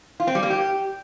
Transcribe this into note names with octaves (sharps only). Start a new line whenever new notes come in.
F4
C4
G3
A#3
G4